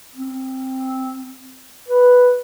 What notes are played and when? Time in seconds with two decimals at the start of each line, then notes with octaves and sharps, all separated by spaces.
0.15 C4
1.88 B4